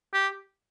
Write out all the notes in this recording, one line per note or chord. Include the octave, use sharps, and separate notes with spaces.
G4